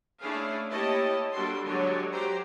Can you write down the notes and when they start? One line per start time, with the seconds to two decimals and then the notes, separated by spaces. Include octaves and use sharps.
0.21 A3 C#4 D4 E4 G#4 F5
0.71 A#3 E4 G4 C#5 D#5 A5
1.31 G3 A#3 D4 F#4 A4 C6
1.65 D3 F#3 G#3 G4 C#5
2.12 F#3 G4 C5 A#5